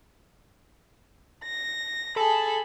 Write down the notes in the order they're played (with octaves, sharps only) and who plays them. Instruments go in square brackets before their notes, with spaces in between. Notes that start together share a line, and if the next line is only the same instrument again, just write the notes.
[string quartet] A#6
[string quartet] G#4 B5 [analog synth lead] A4